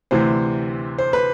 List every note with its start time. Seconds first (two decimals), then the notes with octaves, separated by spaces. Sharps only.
0.11 D2 C3 E3 C5
0.98 C5
1.13 B4